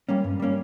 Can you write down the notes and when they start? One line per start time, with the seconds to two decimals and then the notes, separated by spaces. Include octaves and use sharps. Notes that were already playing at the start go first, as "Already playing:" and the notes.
0.09 G3 A#3 C#4
0.24 G2
0.40 G3 A#3 C#4